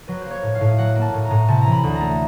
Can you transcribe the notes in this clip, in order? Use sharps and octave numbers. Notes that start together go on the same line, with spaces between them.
F#3 B4
A#3 C5
C#5
A2
F5
A2
F#3 F#5
A#3
A5
A2
A#5
A2
C3 A5
E3 A#5
B5
D2
A#5
A3